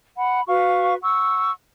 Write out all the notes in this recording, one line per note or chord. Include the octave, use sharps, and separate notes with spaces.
F#5 B5
F#4 B4 F5 C#6
F#5 C#6 E6